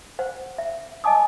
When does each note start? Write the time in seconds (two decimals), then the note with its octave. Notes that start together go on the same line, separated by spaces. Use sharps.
0.19 C5 F#5
0.58 E5
1.04 D#5 F#5 G#5 A5 D6 D#6